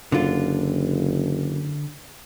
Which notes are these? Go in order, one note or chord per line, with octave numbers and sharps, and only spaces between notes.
F#1 D3 F4